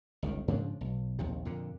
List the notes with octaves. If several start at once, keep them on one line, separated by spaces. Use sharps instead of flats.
G1 C#2 D#3
G#2 C#3 F3 D4
B1
A#1 D#2 C3
F2 A#2 D3